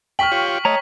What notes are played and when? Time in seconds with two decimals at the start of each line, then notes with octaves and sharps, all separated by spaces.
0.19 G5 C#6 F6 B6 F#7
0.32 F4 G4 C#5 F#7
0.65 A3 C#5 D#5 A#5